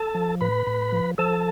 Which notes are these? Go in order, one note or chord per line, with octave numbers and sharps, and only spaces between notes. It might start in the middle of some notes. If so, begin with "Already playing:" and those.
Already playing: A4 A5
F3
A2 B4 B5
A2
F3
F3 A4 A5